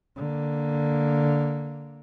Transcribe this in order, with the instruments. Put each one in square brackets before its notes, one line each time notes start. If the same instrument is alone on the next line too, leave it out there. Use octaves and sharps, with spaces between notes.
[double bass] D3 A#3